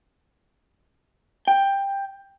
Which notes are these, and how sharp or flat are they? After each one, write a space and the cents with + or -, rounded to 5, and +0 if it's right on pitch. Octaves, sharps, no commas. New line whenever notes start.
G5 +10